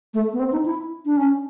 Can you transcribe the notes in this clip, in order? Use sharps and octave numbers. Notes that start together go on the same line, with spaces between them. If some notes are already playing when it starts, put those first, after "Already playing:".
A3
B3
C4
D#4
E4
D4
C#4